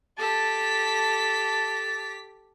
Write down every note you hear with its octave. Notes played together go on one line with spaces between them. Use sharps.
G4 A4 A5 B6